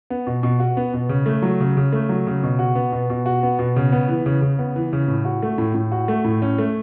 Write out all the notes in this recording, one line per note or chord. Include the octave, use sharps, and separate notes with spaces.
B3
B2
B2
F#4
B3
B2
C#3
A3
F#3
C#3
C#3
A3
F#3
C#3
B2
F#4
B3
B2
B2
F#4
B3
B2
C#3
B3
E3
C#3
C#3
B3
E3
C#3
A2
F#4
A3
A2
A2
F#4
A3
A2
C#4
A3